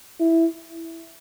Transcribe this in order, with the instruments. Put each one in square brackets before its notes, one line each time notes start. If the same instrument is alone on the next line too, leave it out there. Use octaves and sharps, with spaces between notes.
[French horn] E4